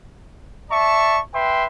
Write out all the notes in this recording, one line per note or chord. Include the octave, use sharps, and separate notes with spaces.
D5 E5 A5 C#6
B4 E5 G5 C6